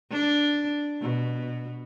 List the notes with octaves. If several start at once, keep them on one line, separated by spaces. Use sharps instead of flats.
D4
B2